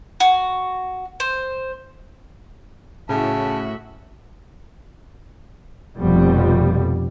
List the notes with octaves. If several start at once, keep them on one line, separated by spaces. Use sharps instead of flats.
F#4
C5
A2 C#3 F#4 E5 A5
F1 F2 B2 G3